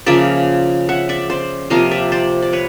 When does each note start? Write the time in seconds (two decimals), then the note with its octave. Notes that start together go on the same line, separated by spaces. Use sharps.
0.06 C#3 F3 A#3 D5 E5
0.89 E5 F#5
1.09 D5 E5
1.30 C5 D5
1.70 C3 F3 A#3 D#5 F5
1.91 D5 E5
2.12 C5 D5
2.42 D5
2.53 B4 C#5